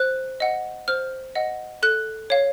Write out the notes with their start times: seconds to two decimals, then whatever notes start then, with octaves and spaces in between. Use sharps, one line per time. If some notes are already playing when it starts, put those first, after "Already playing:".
Already playing: C5 F#6
0.40 D#5 F#5
0.88 C5 F6
1.35 D#5 F#5
1.83 A4 F#6
2.30 C#5 F5